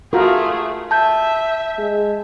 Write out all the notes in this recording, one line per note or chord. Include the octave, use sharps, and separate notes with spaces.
A3 F4 F#4 G#4 A#4
E5 A5 G6
G#3